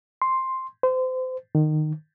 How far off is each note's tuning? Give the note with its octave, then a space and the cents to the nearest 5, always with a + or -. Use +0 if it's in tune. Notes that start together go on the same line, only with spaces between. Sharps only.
C6 +5
C5 -30
D#3 -20